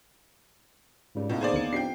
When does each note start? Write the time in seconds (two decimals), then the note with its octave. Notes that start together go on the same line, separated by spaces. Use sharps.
1.15 C#2 G#2 G3
1.30 A2 B3 D#4 F5
1.41 D#2 G#4 C5 D5
1.53 D2 A#3 C#7
1.73 F2 D4 G4 G5 C7